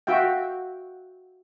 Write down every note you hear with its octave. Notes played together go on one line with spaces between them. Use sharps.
F#4 E5 F5 G5